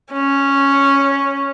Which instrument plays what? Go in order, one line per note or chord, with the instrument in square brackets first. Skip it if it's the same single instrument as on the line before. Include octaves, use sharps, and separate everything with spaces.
[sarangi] C#4